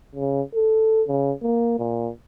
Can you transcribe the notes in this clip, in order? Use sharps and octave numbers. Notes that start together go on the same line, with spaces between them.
C#3
A4
C#3
A#3
A#2